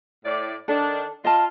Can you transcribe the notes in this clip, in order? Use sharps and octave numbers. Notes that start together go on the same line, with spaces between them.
A2 D5
D#3 D4 A4
F4 D#5 A5